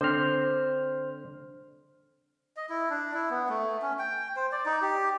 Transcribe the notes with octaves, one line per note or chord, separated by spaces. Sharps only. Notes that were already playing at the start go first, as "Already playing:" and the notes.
D3 C4 C5 F6
D#5
E4
D4
E4
B3
A3
C#4
G5
C5
D5
D#4
G4